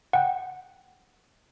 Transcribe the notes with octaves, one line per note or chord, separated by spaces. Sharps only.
F#5 G5